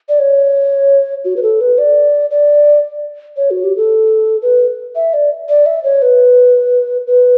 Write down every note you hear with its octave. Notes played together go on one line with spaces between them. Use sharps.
D5
C#5
F#4
B4
A4
B4
D5
D5
C#5
F#4
G4
A4
B4
E5
D5
D5
E5
C#5
B4
B4